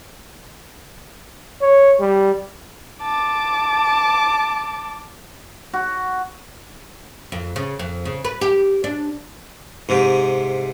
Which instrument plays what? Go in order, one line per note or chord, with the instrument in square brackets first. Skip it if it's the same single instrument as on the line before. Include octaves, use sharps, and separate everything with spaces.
[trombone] C#5
G3
[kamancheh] A5 D6
[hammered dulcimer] F#4
[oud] F2
C#3
F2
C#3
B4
G4
D4
[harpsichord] G#2 C3